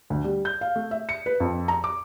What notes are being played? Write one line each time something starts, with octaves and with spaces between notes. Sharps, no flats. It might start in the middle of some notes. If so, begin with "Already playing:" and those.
D2
G3
G6
F5
A3
E5
C#7
B4
F2
A#5
D6